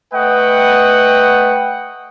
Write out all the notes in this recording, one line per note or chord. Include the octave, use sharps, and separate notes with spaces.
A3 B4 D#5 F#5 G5